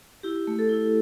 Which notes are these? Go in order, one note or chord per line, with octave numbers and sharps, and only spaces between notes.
E4 G4
A3
A4
E4